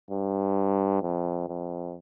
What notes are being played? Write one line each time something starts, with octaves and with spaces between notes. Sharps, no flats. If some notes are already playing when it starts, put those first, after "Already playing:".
G2
F2
F2